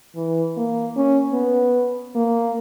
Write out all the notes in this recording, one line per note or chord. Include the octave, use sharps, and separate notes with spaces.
E3
A#3
C#4
B3
A#3